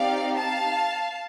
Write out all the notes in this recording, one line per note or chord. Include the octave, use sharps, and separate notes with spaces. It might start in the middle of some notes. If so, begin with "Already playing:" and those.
Already playing: C4 D#4 G4 D5 F5
F5 A5